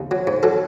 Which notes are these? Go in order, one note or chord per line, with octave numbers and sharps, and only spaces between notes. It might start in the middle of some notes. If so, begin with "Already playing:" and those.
Already playing: D#2
F#3
G#2
F#3 A4